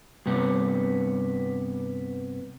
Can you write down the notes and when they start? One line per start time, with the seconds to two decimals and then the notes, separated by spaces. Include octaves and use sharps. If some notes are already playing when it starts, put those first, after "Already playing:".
0.26 G2 C3 G3 B3